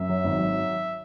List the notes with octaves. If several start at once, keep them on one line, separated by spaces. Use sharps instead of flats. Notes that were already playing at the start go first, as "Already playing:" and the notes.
Already playing: F#2 E5
F#3
G#1
F#3